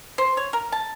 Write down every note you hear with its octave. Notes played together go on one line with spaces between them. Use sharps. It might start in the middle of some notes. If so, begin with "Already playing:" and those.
C5
C#5
A#4
A5